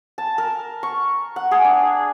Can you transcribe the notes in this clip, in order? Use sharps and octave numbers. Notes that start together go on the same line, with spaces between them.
A5
A#4
C#6
F#5
G#4
D4